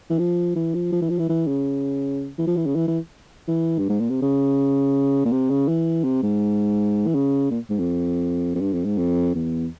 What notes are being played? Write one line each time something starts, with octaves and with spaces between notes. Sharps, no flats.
E3
F3
E3
F3
F3
E3
F3
E3
E3
C#3
E3
F3
E3
C#3
E3
E3
E3
G2
G#2
A#2
C3
C#3
A#2
C3
C#3
E3
C3
G#2
E3
C#3
A#2
G#2
F2
F2
G2
F2
G#2
F2
E2